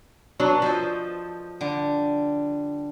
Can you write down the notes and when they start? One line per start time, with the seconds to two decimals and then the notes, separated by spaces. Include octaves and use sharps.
0.40 F#3 B3 D4
0.62 F3 A4 C5 D#5
1.61 D3 G3